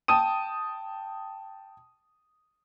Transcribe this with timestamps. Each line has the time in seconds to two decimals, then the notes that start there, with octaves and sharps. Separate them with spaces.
0.08 G5 A5 D#6 D#7